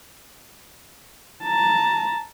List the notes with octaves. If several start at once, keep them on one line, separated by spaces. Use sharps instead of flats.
A5 A#5